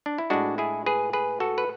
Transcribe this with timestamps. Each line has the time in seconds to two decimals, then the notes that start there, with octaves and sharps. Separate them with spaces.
0.06 D4
0.18 E4
0.30 A2 G#3 D4 F#4
0.58 E4 G#4
0.86 G#4 B4
1.13 G#4 B4
1.40 F#4 A4
1.58 B4